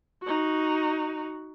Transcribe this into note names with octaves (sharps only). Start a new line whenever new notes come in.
D#4 F#4